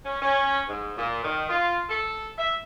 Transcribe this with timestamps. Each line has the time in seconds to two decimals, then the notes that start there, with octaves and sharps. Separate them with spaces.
0.05 C#4
0.21 C#4
0.68 G#2
0.97 A#2
1.24 D#3
1.49 F4
1.89 A4
2.38 E5